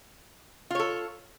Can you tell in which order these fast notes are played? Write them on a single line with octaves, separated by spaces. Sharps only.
F4 C#5 A4